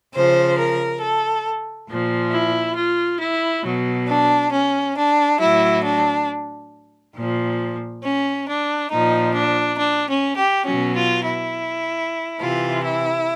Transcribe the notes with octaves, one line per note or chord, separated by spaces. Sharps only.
C#3 F3 C5
A#4
A4
A#2 F3
E4
F4
E4
B2 F#3
D4
C#4
D4
A2 F#3 E4
D4
A#2 F3
C#4
D4
A#2 F3 D#4
D4
D4
C#4
G4
B2 F#3 C#4
F4
E4
C3 E3 F4
E4